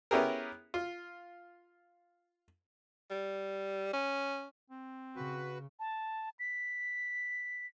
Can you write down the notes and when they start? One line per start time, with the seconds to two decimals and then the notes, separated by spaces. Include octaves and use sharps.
0.11 B3 C#4 E4 G4 G#4 A#4
0.74 F4
3.10 G3
3.93 C#4
4.70 C4
5.16 C#3 F#4 B4
5.80 A5
6.39 B6